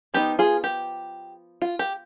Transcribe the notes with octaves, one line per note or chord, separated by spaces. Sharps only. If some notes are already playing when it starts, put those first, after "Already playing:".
F3 B3 D#4 G4
F4 G#4
G4
F4
G4